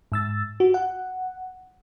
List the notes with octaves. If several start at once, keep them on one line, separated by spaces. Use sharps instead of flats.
G#2 E6 A6
F#4
F#5